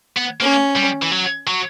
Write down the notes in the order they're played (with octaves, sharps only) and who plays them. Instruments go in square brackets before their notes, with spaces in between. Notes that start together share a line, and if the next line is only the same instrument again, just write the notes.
[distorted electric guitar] B3
[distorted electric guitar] A#3 [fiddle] C#4
[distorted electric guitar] G3
E3
F#3
F#3